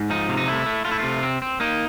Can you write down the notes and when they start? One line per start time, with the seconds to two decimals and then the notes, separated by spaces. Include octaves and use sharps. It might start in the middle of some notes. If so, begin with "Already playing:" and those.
Already playing: G#2
0.10 F3 D#4
0.29 C3
0.37 D#4
0.47 A3 E4
0.66 A3
0.85 A3 F4
0.92 E4
0.99 C3 F4
1.23 C4
1.42 C4
1.60 A#3 D#4